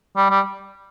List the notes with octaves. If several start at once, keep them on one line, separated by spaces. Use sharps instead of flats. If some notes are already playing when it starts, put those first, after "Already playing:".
G3
G3